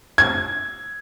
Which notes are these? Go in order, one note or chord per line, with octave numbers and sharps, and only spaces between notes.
G#6